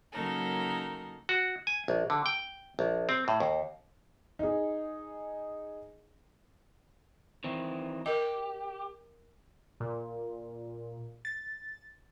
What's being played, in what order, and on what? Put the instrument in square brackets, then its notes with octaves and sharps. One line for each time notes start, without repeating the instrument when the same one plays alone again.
[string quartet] C#3 F#3 A#3 D#4 A4 A#4
[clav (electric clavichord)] F#4
G#5
A#1
D3
G5
A#1
C4
A2
D#2
[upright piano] D#4 G#4
[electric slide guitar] D#3 E3 C4
[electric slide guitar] G4 [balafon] A#4 D#5
[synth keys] A#2
A6